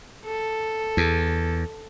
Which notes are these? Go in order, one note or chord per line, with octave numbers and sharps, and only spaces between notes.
A4
E2